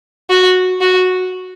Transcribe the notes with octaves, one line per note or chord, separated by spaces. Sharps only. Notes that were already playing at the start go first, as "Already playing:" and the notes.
F#4
F#4